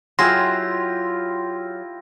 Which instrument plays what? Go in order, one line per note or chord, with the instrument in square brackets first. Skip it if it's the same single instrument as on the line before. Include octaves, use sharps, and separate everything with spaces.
[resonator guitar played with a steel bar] F#3 G#4 [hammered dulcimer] E4 F4 G4 [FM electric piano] C6 [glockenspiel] A#6